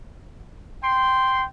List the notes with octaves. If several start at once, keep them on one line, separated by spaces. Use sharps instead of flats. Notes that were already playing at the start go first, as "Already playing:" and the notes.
G5 C6